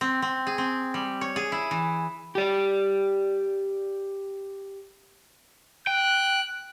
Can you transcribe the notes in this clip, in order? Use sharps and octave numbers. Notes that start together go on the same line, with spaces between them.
C4
C4
G#4
C4
G3
C#5
G#4
E4
E3
G4 D5
G5 F#6